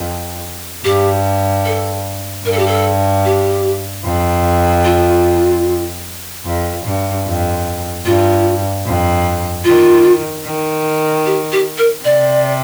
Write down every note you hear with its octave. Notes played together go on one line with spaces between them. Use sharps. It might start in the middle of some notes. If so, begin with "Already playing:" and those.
Already playing: F2
G2 G4
A4
G2 A#4
A4
G4
A4
G4
F2
F4
F2
G2
F2
G2 F4
F2
D#3 F4
D#3
G4
G4
A#4
C3 D5